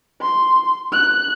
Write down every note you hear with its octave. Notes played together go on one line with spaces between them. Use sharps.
C6
F#6